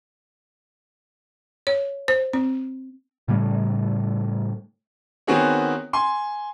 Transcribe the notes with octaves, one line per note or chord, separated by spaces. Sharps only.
C#5
C5
C4
A2 C#3 G3 A3
D#3 B3 C4 F#4 G#4 C#5
G#5 C6